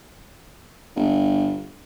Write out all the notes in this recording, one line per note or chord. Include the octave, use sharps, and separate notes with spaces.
G1